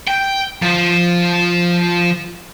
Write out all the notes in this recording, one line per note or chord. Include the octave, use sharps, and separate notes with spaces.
G5
F3